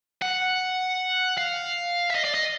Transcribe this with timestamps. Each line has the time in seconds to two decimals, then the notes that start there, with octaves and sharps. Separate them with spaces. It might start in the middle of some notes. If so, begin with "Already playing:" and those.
0.22 F#5
1.38 F5
2.10 E5
2.15 D#5
2.25 D5
2.34 D#5